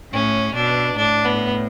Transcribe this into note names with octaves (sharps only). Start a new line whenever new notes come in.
A2 C#4
B2 D4
A2 D4
B3